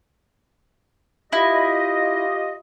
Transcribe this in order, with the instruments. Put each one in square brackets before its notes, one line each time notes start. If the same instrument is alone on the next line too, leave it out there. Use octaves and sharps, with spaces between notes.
[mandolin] E4 [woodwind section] F4 G4 D#5